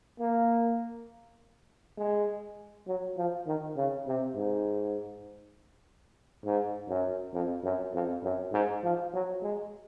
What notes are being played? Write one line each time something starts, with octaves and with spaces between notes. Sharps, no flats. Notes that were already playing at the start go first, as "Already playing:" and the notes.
A#3
G#3
F#3
F3
D#3
C#3
C3
G#2
G#2
F#2
F2
F#2
F2
F#2
G#2
F3
F#3
G#3